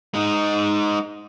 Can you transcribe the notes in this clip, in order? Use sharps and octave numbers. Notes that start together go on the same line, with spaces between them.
G#3 D#4